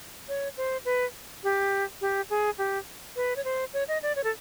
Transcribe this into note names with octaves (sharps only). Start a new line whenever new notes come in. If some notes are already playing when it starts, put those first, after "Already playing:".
C#5
C5
B4
G4
G4
G#4
G4
B4
C#5
C5
C#5
D#5
D5
C#5
A4